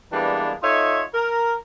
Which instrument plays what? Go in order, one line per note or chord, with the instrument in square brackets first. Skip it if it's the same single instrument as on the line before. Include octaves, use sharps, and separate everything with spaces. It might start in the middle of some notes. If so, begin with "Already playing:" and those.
[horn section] E3 G3 G#3 A#3 B3 D4
D#4 F4 A4 C#5 D#5 E5
A#4